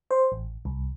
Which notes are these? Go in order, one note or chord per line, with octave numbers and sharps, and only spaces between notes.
C5
A1
C2